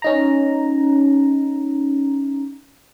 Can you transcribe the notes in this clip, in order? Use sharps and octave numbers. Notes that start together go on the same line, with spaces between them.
C#4 D#4 A#5